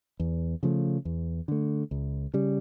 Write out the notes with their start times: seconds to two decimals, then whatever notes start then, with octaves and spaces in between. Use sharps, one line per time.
0.20 E2
0.63 C#3 F3 A3
1.05 E2
1.48 D3 A3
1.91 C#2
2.34 C#3 G3